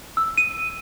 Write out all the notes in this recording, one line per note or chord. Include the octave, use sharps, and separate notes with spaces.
E6
D#7